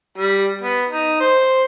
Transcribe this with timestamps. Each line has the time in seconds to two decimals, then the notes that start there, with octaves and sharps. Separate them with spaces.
0.18 G3
0.61 B3
0.89 D#4
1.20 C5